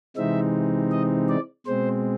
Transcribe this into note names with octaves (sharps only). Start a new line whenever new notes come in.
C3 E3 G#3 C4 D#4 E5
D#5
D5
B2 G#3 C4 C5